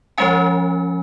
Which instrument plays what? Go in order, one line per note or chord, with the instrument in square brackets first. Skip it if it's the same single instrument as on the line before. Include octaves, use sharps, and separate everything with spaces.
[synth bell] F3 G#3 C#4 G#5